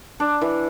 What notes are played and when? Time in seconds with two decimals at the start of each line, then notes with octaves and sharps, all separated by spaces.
0.20 D4
0.41 E3